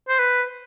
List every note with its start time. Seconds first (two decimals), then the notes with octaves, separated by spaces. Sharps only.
0.09 C5
0.19 B4